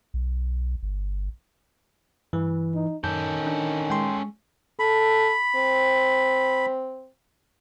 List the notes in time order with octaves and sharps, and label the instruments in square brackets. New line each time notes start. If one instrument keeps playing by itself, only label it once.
[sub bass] B1
G1
[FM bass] G2 [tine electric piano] E3
[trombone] D#4
[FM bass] F#2 [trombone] D#3 [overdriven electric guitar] C#4 A4 [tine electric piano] G6
[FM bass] D4
[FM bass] G#3 [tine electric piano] G5 C6
[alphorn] A4 [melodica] B5
[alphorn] C4